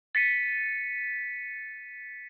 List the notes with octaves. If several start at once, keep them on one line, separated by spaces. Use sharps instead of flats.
A6 B6 C#7 D#7